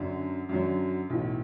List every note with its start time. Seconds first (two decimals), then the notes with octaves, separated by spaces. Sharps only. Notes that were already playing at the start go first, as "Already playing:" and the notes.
Already playing: F#2 D3 F#3
0.49 F#2 D3 F#3
1.10 B1 A2 E3